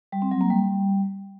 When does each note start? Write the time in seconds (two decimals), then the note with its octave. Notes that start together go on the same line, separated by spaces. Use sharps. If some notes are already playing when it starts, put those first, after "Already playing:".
0.12 G3
0.22 C4
0.31 F#3
0.41 A#3
0.50 G3